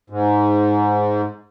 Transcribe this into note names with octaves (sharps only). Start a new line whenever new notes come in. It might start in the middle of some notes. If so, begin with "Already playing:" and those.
G#2